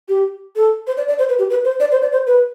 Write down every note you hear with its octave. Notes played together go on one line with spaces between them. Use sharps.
G4
A4
C5
D5
D5
C5
B4
G4
B4
C5
D5
C5
D5
C5
B4